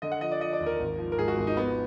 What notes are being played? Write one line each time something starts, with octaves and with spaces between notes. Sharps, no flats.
D3 D#5
F#5
F3 D#5
D5
F3 D#5
D5
D#2
A#4
G#1
F3
A#4
G#2 G#4
F#4
G#1
D#4
F3 B3